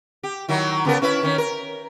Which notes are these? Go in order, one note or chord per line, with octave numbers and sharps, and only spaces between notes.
G4
D#3 F#3 E4
C#3 B3 A#4
C#4 E4 B4
D#3 C#4
A#4